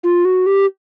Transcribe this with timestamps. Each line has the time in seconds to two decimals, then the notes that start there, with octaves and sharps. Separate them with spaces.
0.04 F4
0.25 F#4
0.46 G4